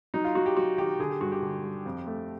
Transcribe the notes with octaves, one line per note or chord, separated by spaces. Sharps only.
F#3 D#4
F4
F#3 F#4
G4
F#3 F#4
D#3 G4
D3 G#4
G4
G2 F#4
G4
D3
G3
F2
A3